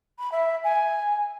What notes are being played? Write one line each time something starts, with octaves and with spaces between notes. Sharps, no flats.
B5
E5
G#5